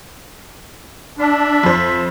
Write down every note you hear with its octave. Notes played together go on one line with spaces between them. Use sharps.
D4 E5 A5 B5
F2 C5